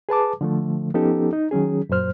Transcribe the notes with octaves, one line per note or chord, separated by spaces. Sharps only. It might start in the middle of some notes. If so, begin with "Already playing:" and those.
G#4 B4 A5 D6
D3 F3 A3
F3 B3 C#4 D#4 G4 A4
D#4
D#3 F#3 C#4 G#4
F#2 A#2 F#3 C5 F6